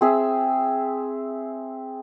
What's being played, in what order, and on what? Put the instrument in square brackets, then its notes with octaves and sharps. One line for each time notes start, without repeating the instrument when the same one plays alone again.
[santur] C4 G#4 E5